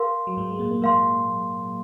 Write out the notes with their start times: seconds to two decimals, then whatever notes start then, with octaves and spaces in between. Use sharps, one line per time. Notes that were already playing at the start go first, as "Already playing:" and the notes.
Already playing: A#4 F5 C6
0.27 F#3
0.37 G#2 G#3
0.51 G#3
0.59 A#2 A#3
0.71 A#3
0.81 G#2 G#3 A#4 F5 C6